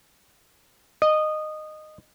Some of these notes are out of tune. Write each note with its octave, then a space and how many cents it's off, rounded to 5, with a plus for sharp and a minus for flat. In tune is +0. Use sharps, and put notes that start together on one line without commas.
D#5 -15